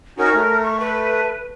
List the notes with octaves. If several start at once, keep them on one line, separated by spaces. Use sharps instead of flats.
C#4 D#4 F#4 A#4
A3
C#6
B4